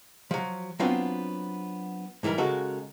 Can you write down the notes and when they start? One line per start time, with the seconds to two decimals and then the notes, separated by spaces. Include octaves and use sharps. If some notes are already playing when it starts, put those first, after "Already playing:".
0.31 F3 F#3
0.79 F#3 B3 C4 D4 F4
2.23 G#2 E3 G3 A#4
2.38 C#3 G#3 F#4 A4 A#4